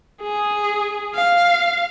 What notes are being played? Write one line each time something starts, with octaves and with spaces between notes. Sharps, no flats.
G#4
F5